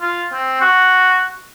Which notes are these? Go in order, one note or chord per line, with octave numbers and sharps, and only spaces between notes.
F4
C4
F#4